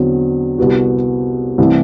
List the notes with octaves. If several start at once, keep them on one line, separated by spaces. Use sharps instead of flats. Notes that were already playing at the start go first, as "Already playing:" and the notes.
Already playing: E2 D3 F#3 C4 F#4
C2 C3 G3 B3 F#4
C2 C3 E3 A3